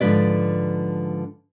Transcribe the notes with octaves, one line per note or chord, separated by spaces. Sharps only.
G#2 D3 F3 A#3 B4 D5